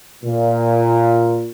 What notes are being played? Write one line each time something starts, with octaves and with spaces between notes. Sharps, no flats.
A#2